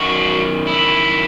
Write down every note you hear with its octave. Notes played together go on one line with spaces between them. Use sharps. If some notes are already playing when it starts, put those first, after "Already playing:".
Already playing: F#2 D#3 F#4
E4